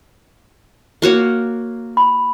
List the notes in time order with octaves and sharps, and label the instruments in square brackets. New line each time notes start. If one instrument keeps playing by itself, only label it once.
[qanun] A#3 F#4 C#5
[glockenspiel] B5